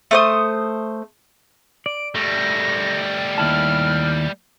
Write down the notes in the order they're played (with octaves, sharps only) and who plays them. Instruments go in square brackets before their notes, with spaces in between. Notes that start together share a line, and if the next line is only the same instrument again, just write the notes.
[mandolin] A3 C5 D#6
[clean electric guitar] D5 [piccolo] D7
[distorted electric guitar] G3 A3 [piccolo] A#6
[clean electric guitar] D#2 E4 A5 [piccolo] F6